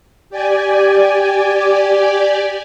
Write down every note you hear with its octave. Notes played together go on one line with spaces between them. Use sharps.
G4 D5 G#5